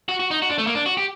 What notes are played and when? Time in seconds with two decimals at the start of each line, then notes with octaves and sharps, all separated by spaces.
0.09 F#4
0.20 F#4
0.31 D#4
0.42 F#4
0.50 D4
0.58 A3
0.67 A#3
0.75 D4
0.86 F#4
0.97 G4